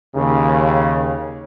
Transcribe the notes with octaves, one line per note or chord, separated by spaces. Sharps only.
D#2 C#3